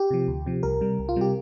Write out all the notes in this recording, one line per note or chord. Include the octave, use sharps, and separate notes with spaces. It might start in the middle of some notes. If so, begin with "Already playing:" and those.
Already playing: G4
C3 F3
D2
C3 F3
C2 A#4
C3 G3
C2
F4
C3 G3 G4